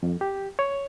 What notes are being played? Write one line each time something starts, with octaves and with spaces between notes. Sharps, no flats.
F2
G4
C#5